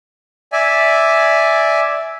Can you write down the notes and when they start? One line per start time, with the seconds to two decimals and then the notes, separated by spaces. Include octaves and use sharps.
0.52 D5 E5 G#5